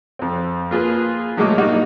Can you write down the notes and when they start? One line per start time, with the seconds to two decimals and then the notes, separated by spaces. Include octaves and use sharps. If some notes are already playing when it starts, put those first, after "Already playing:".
0.19 F2 C4
0.71 A#3 F4 G#4 B4
1.37 A2 F#3 G#3 A#3 D#5 D6
1.58 G2 G3 A#3 D#4 F#4